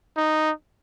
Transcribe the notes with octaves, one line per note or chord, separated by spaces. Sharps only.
D#4